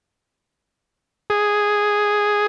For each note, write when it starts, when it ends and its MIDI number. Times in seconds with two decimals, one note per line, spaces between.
1.30 2.47 68